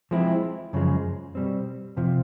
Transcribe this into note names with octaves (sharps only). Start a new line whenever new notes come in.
F3 G#3 C4 E4
F#2 C#3 F3 G#3
B2 G3 C4
F2 C3 F3